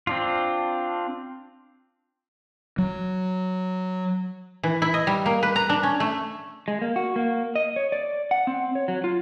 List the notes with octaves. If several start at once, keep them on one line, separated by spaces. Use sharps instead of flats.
C4 D4 F4
F#3
E3
E4
D#5
G3
A#3
B4
A#5
D4
C#4
A3
G#3
A#3
F#4
A#3
D#5
C#5
D5
F#5
C4
C#5
F#3
F4